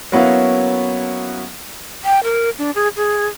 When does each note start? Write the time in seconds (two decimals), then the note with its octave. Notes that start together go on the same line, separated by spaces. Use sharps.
0.12 F#3 A#3 B3 C#4 E4 F5
2.05 G5
2.24 A#4
2.58 D4
2.75 G#4
2.97 G#4